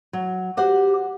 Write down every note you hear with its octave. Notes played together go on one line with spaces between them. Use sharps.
F#3
F#4 G4 C5 F#5